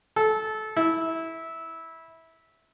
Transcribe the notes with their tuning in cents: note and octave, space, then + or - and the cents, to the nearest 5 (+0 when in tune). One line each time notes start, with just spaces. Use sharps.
A4 -20
E4 -15